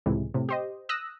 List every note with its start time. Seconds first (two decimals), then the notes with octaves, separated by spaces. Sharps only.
0.06 C#2 A2 C3 E3 G#3
0.34 A2 C3
0.49 G4 C5 D#5
0.89 D#6 E6 F#6 A#6